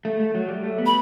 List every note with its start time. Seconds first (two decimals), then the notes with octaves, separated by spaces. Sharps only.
0.05 A3
0.20 A3
0.35 F#3
0.48 G3
0.64 A3
0.78 B3
0.86 B5